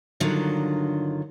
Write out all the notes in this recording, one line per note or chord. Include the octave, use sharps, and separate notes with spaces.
G2 D3 D#3 F#3 F4